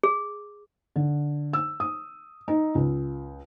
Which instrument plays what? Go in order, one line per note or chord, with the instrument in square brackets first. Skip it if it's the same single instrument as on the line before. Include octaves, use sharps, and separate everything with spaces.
[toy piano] G#4
[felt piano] D3
E6
D#6
D#4
C#2